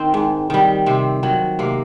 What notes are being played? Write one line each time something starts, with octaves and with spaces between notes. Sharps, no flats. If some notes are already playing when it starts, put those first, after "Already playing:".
Already playing: D#3 C4
G#2
D#3 G3
C3 C4
D#3 F#3
C3 A#3